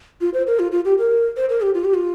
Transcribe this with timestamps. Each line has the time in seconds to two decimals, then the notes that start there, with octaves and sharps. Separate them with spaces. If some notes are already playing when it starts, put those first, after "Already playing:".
0.21 F4
0.34 C5
0.47 A#4
0.59 F4
0.72 F4
0.85 G4
0.98 A#4
1.36 C5
1.49 A#4
1.62 G4
1.74 F4
1.84 G4
1.94 F4